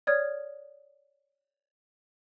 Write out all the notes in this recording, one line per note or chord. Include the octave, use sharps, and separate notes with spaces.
C#5 D5 D#6 F6 G#6